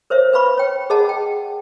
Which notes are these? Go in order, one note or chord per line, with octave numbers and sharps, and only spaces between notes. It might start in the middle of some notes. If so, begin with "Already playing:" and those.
A#4 C5 C#5 E5
B4 F5 B5 C#6
C#5 G5
G#4 A#4 D#5 F#5 A5
G5